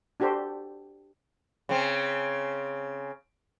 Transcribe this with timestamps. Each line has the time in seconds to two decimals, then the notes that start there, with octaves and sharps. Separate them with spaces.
0.20 D4 F#4 G4 A4 C5
1.69 C#3 C4